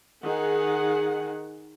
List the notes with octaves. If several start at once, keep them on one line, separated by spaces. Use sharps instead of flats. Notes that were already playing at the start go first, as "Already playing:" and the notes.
D#3 G#4 F#5